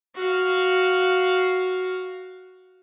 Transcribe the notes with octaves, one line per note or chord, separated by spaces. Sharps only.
F#4 F5